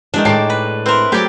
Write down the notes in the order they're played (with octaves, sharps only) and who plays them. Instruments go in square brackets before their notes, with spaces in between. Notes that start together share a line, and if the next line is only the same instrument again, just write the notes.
[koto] D#3 D4 [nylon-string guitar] E3 G#3
[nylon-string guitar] A2 G#3 [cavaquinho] D#4 D6 [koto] D5 [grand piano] G5 A5 C7
[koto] B4
[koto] C4 A#4 [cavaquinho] E4 B4 C6
[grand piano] F#3 A3 [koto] G4 D5 [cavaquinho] G#4 G5